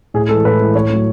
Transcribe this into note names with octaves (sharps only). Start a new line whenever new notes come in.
A2 G#4
E3 G#3 A4
A2 B4
E3 G#3
A2 C#5
F#3 A3